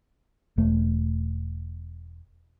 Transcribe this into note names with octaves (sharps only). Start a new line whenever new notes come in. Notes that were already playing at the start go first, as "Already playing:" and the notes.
E1 A3